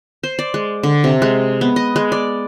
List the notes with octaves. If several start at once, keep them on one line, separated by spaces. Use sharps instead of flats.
C5
D5
G#3
D3
C3
G#3
B3
D#5
G#3
D5